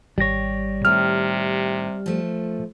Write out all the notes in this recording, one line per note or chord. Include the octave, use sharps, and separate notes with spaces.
G#1 G3 G4 C#5 A#6
A2 C3 D#3 F6
F3 A3